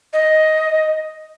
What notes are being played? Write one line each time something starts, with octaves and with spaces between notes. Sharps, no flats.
D#5